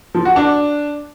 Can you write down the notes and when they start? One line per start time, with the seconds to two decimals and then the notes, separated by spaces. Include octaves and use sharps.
0.15 F3
0.25 F#4
0.36 D4